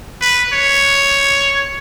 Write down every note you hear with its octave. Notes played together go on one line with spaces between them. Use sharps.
B4
C#5